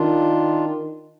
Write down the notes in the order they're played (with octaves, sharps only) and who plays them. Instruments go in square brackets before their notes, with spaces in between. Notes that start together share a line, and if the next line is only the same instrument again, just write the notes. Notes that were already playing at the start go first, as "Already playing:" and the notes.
Already playing: [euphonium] D#3 [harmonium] D4 F4